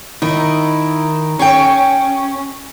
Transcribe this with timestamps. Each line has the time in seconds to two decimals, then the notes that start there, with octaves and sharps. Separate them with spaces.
0.22 D#3 D#4 E4
1.39 C#4 G#4 C#5 G5